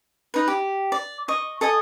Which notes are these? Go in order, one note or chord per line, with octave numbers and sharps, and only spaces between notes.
D#4 B4
G4
D5
D#5 C#6
A4 D#5 G#5 D#6